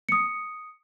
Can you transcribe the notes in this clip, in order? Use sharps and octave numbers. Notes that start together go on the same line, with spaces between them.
D#6 C#7